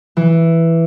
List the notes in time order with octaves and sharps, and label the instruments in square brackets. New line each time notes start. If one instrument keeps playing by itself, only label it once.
[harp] E3